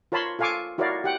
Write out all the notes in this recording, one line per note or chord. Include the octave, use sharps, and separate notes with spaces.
F4 A#4 C#5 A5 B5 C6
F4 A4 F5 G#5 C#6 D6
E4 F#4 A#4 C#5 D5 F5
G4 F#5 G5